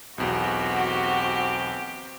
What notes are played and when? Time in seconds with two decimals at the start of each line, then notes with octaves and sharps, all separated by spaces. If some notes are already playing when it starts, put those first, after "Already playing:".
0.18 B1 E2 C4 F#4 G4